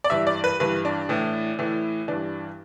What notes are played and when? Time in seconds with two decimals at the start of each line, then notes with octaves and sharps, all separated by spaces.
0.04 D5
0.10 G2 E3 E5
0.27 D5
0.44 B4
0.60 G2 E3 B4
0.85 D4
1.09 A2 E3
1.59 A2 E3
2.08 G2 E3 D4